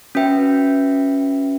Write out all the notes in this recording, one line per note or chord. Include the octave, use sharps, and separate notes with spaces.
C#4 F#4 B4 E5 G5